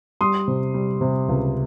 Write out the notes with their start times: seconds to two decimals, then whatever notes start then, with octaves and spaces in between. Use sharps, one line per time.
0.21 G3 C6 D#6
0.48 C3
0.74 G3
1.01 C3
1.28 C#2